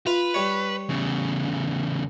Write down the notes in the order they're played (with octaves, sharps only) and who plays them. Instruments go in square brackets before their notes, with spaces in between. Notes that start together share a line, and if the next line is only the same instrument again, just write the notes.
[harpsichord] F4 [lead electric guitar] B4
[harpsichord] G3 C#5
[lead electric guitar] E2 C#3